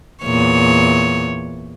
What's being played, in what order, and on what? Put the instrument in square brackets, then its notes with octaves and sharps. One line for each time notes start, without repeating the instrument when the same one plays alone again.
[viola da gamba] E2 A#2 C#5